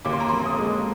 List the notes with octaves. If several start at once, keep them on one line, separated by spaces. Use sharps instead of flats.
D#2 D6
C6
A#5
F1 C6
D#6
G#3